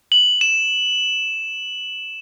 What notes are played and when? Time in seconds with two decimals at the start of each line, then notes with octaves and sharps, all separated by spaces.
0.12 F#7
0.41 E7